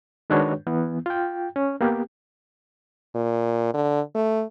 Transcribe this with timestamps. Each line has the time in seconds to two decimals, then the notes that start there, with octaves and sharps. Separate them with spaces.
0.30 D#3 G#3 D4 F#4 B4 C#5
0.67 E3 B3
1.06 F4 G5
1.56 C#4
1.81 A#3 B3 G4
3.15 A#2
3.74 D3
4.15 A3